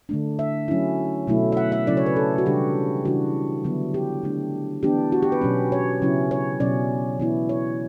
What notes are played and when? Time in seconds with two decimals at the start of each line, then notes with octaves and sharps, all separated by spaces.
0.09 D3 A3 D4
0.39 E5
0.68 F#3 C#4 E4
1.27 B2 F#3 A3 E4
1.52 E5
1.57 F#5
1.72 E5
1.87 C#3 F#3 C#4 E4 D5
1.97 C#5
2.06 B4
2.16 A4
2.38 F#4
2.46 C#3 E3 G3 D4 G4
3.05 C#3 E3 G3 D4 F#4
3.64 D3 F#3 B3 E4
3.94 G4
4.23 D3 A3 D4
4.83 E3 B3 D4 G4
5.12 F#4
5.23 G4
5.32 B4
5.42 B2 F#3 C#4
5.72 C#5
6.02 C#3 F#3 C#4 E4
6.31 C#5
6.60 B2 F#3 C#4 D5
7.20 E3 B3 E4
7.49 C#5